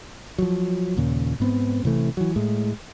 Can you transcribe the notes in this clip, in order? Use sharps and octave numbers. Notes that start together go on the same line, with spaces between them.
F3 F#3
D#2 A#2 C#3
G#2 B3 C4
A1 C3 E3 A3
E3 F#3
A2 G#3